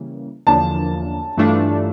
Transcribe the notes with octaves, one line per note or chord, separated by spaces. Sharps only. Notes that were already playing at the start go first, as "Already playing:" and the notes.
Already playing: C#3 E3 G3 A#3
E2 D3 F3 A#3 D4 A5
G2 E3 A3 D4 F4